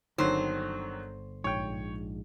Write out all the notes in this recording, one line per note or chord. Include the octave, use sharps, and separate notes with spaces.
G1 D3 D#3 F#3 C4 C5
A#1 G#2 C#5 G5